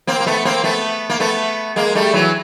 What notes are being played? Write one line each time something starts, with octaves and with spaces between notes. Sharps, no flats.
A#3 C4
A#3
A3 B3
A#3 C4
A3 B3
A#3
A3 B3
G#3 A#3
G3 A3
E3 F#3